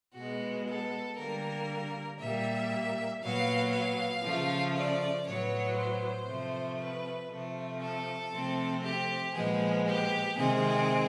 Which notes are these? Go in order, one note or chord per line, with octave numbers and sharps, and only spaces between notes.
B2 G#3 B3 F#4
A4
D3 G3 A#3 A#4
A#2 G3 A#3 E5
A#2 F#3 B3 F5
F5
C#3 F3 A3
D5
A2 F#3 B3 C#5
C5
C3 F3 A3
B4
C3 F3 A3
A4
C3 F3 A3 C4
G4
A#2 F3 G#3 B3 G#4
G4
C3 D#3 G#3 C4 G#4